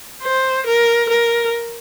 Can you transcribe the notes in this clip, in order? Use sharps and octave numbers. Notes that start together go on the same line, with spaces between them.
C5
A#4
A#4